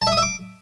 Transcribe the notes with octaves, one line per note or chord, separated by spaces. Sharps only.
A5
E5
D#6
E5
D6